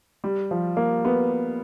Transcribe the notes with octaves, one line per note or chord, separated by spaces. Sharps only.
G3
F3
A#3
B3